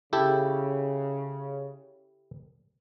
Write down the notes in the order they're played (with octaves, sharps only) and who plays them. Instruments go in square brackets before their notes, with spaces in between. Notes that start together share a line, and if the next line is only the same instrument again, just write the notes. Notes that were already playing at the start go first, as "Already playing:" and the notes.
[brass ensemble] C#3 [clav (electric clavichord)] E4 G4 A4